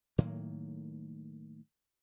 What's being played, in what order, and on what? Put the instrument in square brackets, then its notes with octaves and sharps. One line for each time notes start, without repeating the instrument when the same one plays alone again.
[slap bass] A2 D#3 F#3 A#3